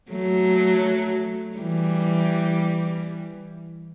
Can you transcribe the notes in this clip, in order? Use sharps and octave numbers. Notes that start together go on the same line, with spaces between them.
F#3 A3
E3 G3